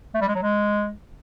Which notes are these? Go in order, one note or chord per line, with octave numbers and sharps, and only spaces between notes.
A3
G3
G#3
F#3
G#3